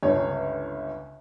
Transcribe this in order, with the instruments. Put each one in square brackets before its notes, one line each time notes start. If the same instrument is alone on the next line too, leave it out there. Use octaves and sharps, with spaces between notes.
[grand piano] G1 C#2 C#5